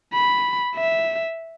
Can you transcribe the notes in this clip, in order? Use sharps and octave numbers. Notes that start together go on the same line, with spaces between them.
B5
E5